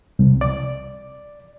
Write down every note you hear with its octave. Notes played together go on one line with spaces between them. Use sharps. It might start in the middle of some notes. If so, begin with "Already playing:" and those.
C2
D5